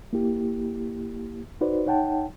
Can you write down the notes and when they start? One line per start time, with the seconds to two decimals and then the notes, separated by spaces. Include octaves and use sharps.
0.13 A#3 E4 G4
1.61 D#4 F#4 B4 C5 D5
1.86 D#4 C#5 F#5 G5 A5